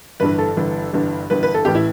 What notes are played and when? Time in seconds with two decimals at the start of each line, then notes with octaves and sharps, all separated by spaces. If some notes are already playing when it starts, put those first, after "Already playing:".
0.20 G1 G2 E3 B4
0.38 A4
0.57 G1 G2 E3
0.93 G1 G2 E3
1.30 G1 G2 E3 B4
1.43 B4
1.54 A4
1.65 A1 A2 E3 G4
1.75 E4